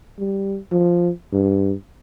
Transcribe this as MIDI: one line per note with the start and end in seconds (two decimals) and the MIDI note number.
0.19 0.58 55
0.72 1.10 53
1.32 1.74 43